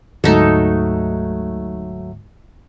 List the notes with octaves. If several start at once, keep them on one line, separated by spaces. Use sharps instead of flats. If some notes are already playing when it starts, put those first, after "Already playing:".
D2 G#2 F#3 A3 D#4 A4